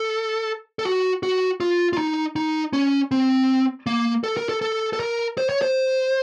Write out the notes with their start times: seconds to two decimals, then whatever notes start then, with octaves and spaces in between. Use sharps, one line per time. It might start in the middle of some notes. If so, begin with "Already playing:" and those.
Already playing: A4
0.79 A4
0.85 F#4
1.23 F#4
1.60 F4
1.93 F4
1.98 D#4
2.36 D#4
2.73 C#4
3.11 C4
3.87 A#3
4.24 A4
4.37 A#4
4.49 A4
4.62 A4
4.93 A4
5.00 A#4
5.38 C5
5.49 C#5
5.62 C5